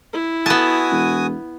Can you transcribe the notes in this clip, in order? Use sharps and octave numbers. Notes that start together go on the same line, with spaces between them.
E4
B3 F#4 G#5 A5 D#6
E1